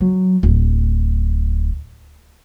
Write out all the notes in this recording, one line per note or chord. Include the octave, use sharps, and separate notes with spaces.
F#3
D1